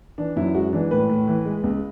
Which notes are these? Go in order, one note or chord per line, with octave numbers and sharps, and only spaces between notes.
E3 D4
F#2 E4
G#3 F#4
E3 D4
A2 B4
A2
E3
G#3
C#2